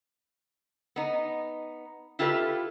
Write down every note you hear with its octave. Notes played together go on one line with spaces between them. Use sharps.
B3 D#4
E4 F4 G4 A4 B4 E5